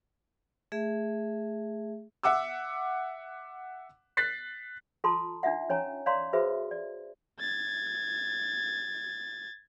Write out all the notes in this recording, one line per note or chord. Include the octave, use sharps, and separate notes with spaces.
A3 G#4 E5
E5 F#5 D6 E6
F#6 A6 B6 C7
F4 A4 A5 A#5 C6
D4 D#4 F4 E5 F#5
C#4 C#5 G#5 A#5
C#5 D5 F5 A#5 C6
F#4 G#4 A4 B4 C5 E5
D5
G#6 A6